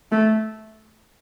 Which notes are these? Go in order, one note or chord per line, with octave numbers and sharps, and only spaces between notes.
A3